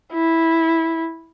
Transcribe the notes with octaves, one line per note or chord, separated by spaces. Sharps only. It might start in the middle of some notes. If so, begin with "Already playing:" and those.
E4